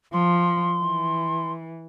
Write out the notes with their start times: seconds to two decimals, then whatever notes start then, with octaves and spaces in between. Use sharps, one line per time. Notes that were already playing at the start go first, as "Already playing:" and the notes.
0.13 F3 C6
0.80 E3